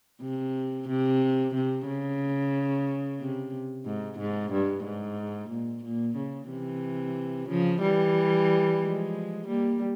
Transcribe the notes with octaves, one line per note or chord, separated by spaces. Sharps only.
C3
C3
C3
C#3
C3
G#2
G#2
G2
G#2
A#2
A#2
C#3
C3 E3
C#3 F3
E3 G3
F3 G#3
G3 A#3